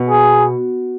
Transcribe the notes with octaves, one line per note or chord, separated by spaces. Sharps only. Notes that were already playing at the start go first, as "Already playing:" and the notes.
Already playing: B2
G#4